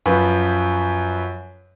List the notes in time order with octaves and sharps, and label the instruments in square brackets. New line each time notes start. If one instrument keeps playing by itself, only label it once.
[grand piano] F#2 F3 B4